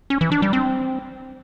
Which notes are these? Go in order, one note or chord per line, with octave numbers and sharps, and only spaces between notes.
C#4
E3
D4
G3
C4